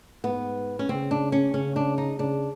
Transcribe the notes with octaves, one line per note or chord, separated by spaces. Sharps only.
G#2 B3
C#4
C#3 C4
D4
C#4
C#3 C#4
D4
D#4
C#3 D4